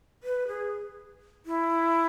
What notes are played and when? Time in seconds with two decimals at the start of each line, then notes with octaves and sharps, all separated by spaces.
0.23 B4
0.48 G#4
1.46 E4